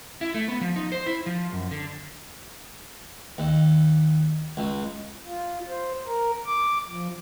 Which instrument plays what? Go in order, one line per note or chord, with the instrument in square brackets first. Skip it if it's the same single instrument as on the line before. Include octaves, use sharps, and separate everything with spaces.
[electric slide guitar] E4
A3
B3
F3
D#4
C5
E4
F3
F#2
D3
[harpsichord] D#2
C#2
[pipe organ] F4
C5
A#4
D6
F3